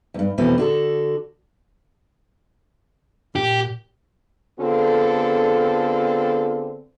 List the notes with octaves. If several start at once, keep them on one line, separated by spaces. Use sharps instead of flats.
E2 G2
F2 B2 E3 A3 C4
D3 F#4 A4
A#2 G4
D3 B3 C4 F4 G#4 A4